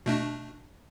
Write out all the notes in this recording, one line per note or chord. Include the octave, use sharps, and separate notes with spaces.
B2 A3 D4